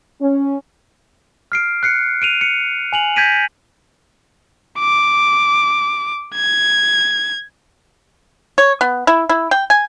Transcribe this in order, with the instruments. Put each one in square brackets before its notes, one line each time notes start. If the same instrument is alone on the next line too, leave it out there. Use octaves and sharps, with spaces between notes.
[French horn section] C#4
[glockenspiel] F6 C7 D7
F#6 C7 C#7
D7 D#7 F7
C#7
G#5 F7 F#7
G6 G#6 A#6 B6 D7 D#7
[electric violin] D6
G#6
[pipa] C#5
B3
E4
E4
G5
G#5